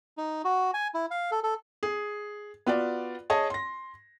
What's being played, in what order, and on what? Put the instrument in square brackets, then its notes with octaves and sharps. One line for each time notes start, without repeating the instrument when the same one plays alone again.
[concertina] D#4
F#4
G#5
E4
F5
A4
A4
[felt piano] G#4
B3 F4 F#4 D5
G#4 C#5 D#5 A5
C6 A#6